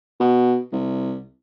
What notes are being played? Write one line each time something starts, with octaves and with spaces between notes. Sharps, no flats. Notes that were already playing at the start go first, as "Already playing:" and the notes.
B2
C2